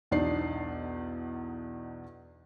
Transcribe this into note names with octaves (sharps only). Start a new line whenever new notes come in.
B1 E2 D4 D#4 D5 C7